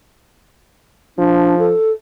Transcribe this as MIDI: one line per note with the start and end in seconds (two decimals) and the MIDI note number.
1.18 1.72 53
1.18 1.58 62
1.59 1.91 69